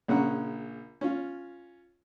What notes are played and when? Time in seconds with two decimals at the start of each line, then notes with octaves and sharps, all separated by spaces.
0.08 A#1 C#3 C#4 F#5
1.01 C#4 F4